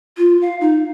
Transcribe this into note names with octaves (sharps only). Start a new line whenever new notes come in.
F4
F5
D#4